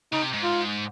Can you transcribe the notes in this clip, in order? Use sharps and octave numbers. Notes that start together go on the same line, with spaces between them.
C#3 D#4
C3
G#2
F4